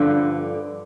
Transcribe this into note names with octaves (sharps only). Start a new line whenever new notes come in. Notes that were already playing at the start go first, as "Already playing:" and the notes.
Already playing: G2 D3 F3